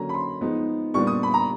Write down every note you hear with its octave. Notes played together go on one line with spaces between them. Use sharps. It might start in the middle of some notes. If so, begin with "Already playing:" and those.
Already playing: D3 F#3 A#3 C#4 A#5
B5
C6
F3 G#3 B3 D#4
A#2 G3 B3 D4 C#6
D#6
B5
A#5